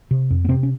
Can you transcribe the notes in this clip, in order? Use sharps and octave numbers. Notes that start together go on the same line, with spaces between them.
C3
F2
B3
C3 C4
C#4